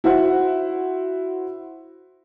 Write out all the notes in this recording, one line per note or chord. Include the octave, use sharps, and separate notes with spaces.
E4 F#4 C5 E5 F#5